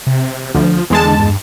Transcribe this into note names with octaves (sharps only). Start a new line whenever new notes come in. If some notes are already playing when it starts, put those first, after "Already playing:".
C3
D2 F3
E2 D3 G#3 A5
G2